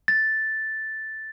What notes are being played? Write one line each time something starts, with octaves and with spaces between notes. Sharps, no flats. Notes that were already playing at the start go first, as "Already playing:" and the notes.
A6